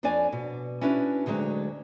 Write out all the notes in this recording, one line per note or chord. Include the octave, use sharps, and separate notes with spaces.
F2 C4 D4 C#5 D5 G#5
B2
C#4 D4 E4 F#4 B4
D2 D3 F#3 G#3 C4